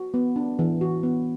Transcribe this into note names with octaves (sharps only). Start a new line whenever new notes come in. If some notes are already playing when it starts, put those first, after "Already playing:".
Already playing: F#4
B3
D4
E3
F#4
B3